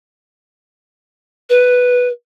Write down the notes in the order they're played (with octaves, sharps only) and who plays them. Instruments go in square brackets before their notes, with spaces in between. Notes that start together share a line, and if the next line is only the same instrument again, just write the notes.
[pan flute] B4